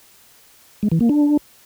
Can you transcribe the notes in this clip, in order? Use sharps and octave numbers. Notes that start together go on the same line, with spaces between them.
G#3
E3
A#3
D4